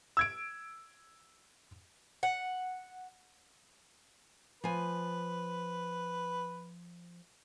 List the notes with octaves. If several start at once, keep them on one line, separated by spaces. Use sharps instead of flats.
E6 G#6 D7
F#5
F3 B4 G#5